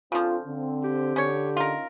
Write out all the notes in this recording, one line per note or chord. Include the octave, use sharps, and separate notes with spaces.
C#3 F3 C4 D4 F4 A4
D3 C4
G4
D3 C#4 C#5
C#4 D#4 F4 A#4